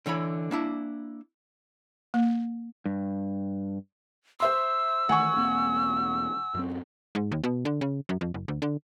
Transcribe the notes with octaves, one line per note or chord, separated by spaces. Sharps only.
D3 E3 C#5 B5
A#3 D4 E4
A#3
G2
C5 E5 C6 E6
D#3 E3 A3 F#5 G#5 C#6
E1 A#3 C4
F#2 F#3 C4
G#2
D#2
B2
D3
C#3
F#2
F2
F#1
D2
D3